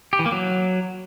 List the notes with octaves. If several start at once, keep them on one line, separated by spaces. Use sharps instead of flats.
G4
E3
A#3
F#3